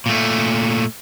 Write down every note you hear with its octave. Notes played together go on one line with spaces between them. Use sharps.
A#2 A3